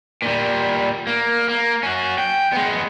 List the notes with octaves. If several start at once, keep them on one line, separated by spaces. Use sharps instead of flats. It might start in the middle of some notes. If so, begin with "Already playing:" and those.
A#2 G3
A#3
A#3
C#4 F#4
G5
G#3 B3